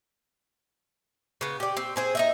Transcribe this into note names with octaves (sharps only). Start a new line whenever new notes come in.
C#3 B3
G4 D5
C4
C4 G#4 C5
D#4 D#5 E5